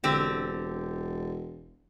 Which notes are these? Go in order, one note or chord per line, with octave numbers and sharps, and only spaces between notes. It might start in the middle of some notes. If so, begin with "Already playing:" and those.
E1 D3 C4 G4